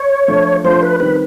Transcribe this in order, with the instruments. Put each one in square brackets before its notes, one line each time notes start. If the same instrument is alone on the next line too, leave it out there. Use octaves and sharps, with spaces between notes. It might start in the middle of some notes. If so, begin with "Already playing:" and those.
Already playing: [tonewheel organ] C#5
[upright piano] F3 A3 D4 F4
[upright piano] F3 A3 D4 F4 [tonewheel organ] C5
[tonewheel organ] B4
[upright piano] D#3 G3 C4 [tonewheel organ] B4